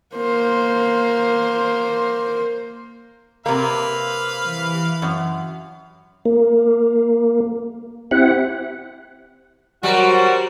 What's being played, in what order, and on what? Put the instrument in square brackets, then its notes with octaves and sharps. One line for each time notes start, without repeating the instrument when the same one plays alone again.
[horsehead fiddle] A#3 C5
[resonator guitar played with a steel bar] C3 A#3 [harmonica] B4 F5 B5
[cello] E3
[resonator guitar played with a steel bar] F#2
[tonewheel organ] A#3
C4 E4 G4 F#5
[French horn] F#3 [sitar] G3 [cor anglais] F#4 [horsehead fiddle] A#4 C5